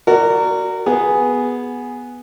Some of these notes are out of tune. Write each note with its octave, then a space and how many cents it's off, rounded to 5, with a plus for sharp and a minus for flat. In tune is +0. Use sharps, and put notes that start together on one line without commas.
F#4 +10 A#4 -20 D5 +0
B3 -5 G#4 +0